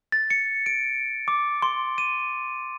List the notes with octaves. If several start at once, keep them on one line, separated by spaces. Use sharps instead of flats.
A6
C#7
D7
D6
C6
D#7